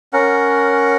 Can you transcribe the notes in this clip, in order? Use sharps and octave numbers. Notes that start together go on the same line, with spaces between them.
C#4 A#4 F#5